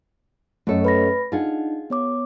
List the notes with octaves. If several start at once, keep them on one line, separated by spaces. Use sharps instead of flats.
F#2 A3 A4 C#5 D#5
B4 B5 A#6
D4 D#4 F4 G#4 F#5
B3 C#5 D6